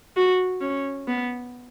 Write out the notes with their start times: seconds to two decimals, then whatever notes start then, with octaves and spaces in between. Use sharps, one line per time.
0.17 F#4
0.62 C#4
1.08 B3